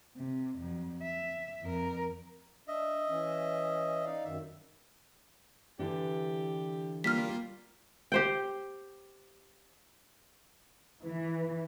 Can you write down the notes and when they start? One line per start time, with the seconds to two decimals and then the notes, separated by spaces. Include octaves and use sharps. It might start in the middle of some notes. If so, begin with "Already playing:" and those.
0.17 C3
0.59 F2 F#3
1.02 E5
1.62 F2 A#4
2.68 D4 D#5 E5
3.09 E3 C#4
4.04 D#4 D5 F5
4.25 F#2 D#3 E5
5.79 D3 E3 D4 G4
7.04 G3 A#3 F4 F6 B6
8.12 G4 C5 G5
11.06 E3